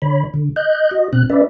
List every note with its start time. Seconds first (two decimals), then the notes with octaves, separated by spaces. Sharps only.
0.02 D3 C#5 B5
0.34 D3
0.56 D#5 F#6 G6
0.91 F#4 D#5
1.13 B2 C4 F#6
1.30 C#4 B4 D5 E5